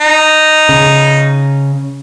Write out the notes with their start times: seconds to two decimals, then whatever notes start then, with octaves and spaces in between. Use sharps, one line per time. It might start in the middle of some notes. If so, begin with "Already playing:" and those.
0.01 D#4
0.69 C#3